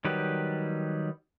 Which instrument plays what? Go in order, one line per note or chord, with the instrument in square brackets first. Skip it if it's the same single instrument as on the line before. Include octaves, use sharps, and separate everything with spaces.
[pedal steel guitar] D#3 F#3 G3 G4 B4